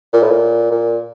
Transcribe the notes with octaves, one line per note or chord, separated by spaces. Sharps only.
A#2
A2
A#2
A#2